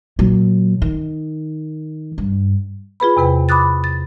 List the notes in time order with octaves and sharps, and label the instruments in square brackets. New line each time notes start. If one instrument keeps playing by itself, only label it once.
[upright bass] A#2 F#3
D#3
G2
[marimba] F4 G#4 B4 B5
E2 C3 B4 G5
B5 D6 D#6 F#6 A6
A6